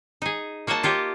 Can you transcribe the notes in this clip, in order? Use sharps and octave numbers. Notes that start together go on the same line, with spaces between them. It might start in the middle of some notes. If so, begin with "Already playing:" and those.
D#4 G#4
A#3 F#4 C#5 D#5 A5
F4 G4 C#5 D#5